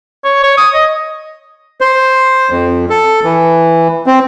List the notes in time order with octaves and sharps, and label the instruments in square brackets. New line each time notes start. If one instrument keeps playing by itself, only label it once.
[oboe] C#5
C#5
D#6
D#5
[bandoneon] C5
F2
A4
E3
C4